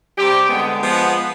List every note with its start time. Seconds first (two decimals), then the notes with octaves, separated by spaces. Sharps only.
0.16 C3 G3 C4 G4
0.48 D3 G#3 B3
0.81 F3 G#3 B3